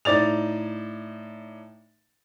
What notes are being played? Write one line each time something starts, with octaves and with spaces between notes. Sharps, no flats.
A2 D#4 D5 A6 F7